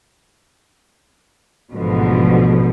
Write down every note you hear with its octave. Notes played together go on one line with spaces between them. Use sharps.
A1 G#2 B2 D3 F3